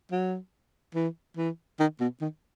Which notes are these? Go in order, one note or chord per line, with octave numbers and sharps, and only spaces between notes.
F#3
E3
E3
D#3
B2
D#3